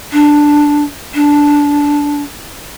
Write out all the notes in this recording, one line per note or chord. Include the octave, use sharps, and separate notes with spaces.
D4
D4